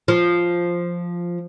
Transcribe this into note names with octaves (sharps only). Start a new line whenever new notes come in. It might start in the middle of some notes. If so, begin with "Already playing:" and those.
F3